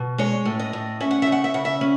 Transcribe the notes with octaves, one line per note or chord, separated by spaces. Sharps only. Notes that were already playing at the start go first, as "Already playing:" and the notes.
Already playing: B2
G#3 C#5
A2
D#5
A2
C#4 E5
F#5
E5
C#3
F#5
E5
C#3 F#5
E5
C#4